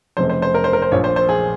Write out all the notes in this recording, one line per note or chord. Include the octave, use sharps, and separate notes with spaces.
F1 F2 C#3 C5
C5
C5
A#4
C5
A#4
C5
A#1 A#2 F3 C#5
C5
C5
G#4